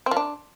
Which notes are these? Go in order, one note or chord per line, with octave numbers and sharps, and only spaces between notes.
C4
F3
D4